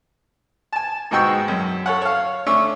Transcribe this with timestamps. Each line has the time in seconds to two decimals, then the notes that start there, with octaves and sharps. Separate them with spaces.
0.73 G#5 A5
1.11 G#2 B2 G#3 G5 C#6 E6
1.48 F#2
1.86 A4 C#5 F#5
2.02 C#5 F5
2.46 A3 C#4 D4 C#6 E6